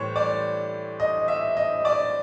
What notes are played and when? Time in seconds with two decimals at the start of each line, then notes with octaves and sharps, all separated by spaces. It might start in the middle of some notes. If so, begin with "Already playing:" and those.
Already playing: A2 E3 G3 C5 C#5
0.16 D5
1.00 D#5
1.28 E5
1.57 D#5
1.85 D5